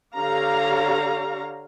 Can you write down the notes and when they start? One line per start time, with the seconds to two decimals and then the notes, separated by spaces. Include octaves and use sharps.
0.17 D3 G4 C#5 F5 A#5